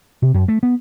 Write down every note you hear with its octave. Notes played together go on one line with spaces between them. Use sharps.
C3
F#2
A3
B3